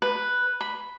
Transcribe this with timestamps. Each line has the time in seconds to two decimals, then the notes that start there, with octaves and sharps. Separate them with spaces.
0.02 B4
0.61 B5